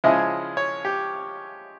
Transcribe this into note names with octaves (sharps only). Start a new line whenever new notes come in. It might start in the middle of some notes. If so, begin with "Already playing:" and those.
C#3 F3 G#3 C#4 E4 D#5
C#5
G4